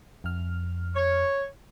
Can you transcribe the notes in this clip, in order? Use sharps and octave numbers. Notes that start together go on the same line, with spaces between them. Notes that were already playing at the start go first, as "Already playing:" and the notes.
F2 F6
C#5